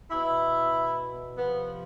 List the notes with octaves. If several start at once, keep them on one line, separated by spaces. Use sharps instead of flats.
B2 E4
C3 F3 B3